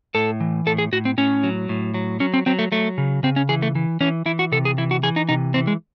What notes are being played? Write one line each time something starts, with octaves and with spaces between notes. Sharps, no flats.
A2 A4
E3
A2 A4
G#4
A2 F#4
C4
A2 C#4
F#3
A2
F#3
F#3 C#4
C4
F#3 C4
A3
F#3 A3
C#3
C#3 C4
C#4
E3 G#4
A3
E3
E3 C#4
E3 E4
F#4
C3 A4
G#4
E3 E4
F#4
E3 G#4
D#4
C3 D#4
E3 C4
G#3